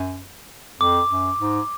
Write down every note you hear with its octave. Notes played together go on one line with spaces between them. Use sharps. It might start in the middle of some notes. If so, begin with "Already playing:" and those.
Already playing: F#2
F2 D6
F#2
G#2